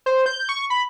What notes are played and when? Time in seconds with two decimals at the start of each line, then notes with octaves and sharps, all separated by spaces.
0.06 C5
0.26 G6
0.49 C#6
0.70 B5